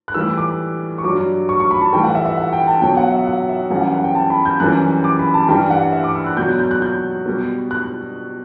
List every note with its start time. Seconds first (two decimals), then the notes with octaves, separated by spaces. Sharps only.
0.08 F#6
0.14 A2 E3 G3 E6
0.37 D6
0.98 C#6
1.04 G2 F#3 D6
1.49 C#6
1.60 C#6
1.71 B5
1.81 A5
1.93 A2 E3 G3 G5
2.04 F#5
2.15 E5
2.26 E5
2.37 F#5
2.53 G5
2.67 A5
2.82 B2 F#3 G5
2.97 F#5
3.12 E5
3.27 F#5
3.49 E5
3.70 F#2 E3 G3 F#5
3.81 F#5
3.92 F#5
4.04 G5
4.15 A5
4.30 B5
4.45 G6
4.60 F#2 E3 G3 F#6
5.04 D6
5.19 B5
5.34 A5
5.48 G2 E3 G3 G5
5.70 F#5
5.93 E5
6.04 D6
6.15 E6
6.26 F#6
6.37 B2 F#3 G6
6.49 F#6
6.59 G6
6.71 F#6
6.82 G6
7.26 B2 G3
7.71 F#6